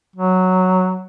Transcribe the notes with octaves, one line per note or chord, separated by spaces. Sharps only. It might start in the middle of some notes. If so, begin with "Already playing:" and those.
F#3